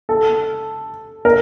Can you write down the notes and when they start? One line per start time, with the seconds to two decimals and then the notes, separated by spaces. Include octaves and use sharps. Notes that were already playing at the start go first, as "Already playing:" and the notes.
0.09 A4
1.25 A#4